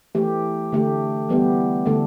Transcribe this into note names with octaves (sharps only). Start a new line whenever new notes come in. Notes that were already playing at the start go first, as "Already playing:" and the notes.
E3 A3 G4
D3 A3 G4
E3 G3 B3 G4
D3 A3 D4 A4